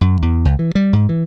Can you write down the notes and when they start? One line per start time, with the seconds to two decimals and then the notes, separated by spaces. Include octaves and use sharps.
0.01 F#2
0.22 E2
0.45 C#2
0.59 E3
0.75 G3
0.93 G#2
1.09 E3